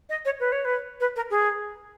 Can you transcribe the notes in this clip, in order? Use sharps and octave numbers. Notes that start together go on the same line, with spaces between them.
D#5
C#5
B4
C#5
B4
B4
A#4
G#4